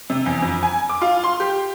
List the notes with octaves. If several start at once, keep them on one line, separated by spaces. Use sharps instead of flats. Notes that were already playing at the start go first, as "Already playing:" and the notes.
C3
E2
F2
G#5
D6
F4
C6
G4